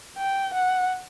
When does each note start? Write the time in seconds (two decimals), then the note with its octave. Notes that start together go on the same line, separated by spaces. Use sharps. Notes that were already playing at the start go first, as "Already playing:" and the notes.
0.18 G5
0.54 F#5